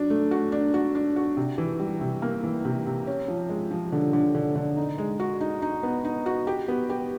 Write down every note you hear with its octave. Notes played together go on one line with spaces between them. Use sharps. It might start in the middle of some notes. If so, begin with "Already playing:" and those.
Already playing: F#3 D4
A3
F#4
D4
F#4
D4
F#4
C3
E3
G3
C3
A#3
E3
C3
C3
C#4
F3
G#3
F3
D3
D3
D3
D3
D#4
G#3
F#4
D#4
D#4
B3
D#4
F#4
G4
B3
G4